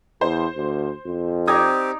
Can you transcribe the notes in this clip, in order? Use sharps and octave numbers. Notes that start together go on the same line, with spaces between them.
E2 C5
D2
F2
C4 D#4 G4 D5 A#5 D#6 G#6